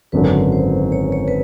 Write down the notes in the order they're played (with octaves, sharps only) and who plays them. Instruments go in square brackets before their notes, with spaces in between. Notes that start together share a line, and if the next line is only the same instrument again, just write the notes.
[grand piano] G#1 F#2 D3 [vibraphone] B4
[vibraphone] C5
C#5
C#5
B4